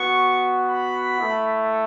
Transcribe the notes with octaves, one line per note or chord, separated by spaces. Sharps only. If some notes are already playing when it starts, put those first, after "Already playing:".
Already playing: B3 F#4 C#6
B5
A3 E4